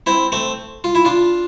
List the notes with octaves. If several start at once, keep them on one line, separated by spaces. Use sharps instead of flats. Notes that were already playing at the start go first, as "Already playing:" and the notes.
C4 E4
A3 C4
F4
E4
D4 F4